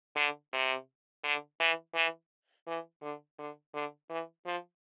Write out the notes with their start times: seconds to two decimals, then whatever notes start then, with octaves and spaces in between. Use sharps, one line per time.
0.16 D3
0.53 C3
1.24 D3
1.60 E3
1.95 E3
2.67 E3
3.02 D3
3.39 D3
3.74 D3
4.10 E3
4.46 F3